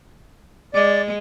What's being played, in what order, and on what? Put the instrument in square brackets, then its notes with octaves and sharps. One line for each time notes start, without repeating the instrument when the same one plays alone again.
[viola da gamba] G#3 [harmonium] D5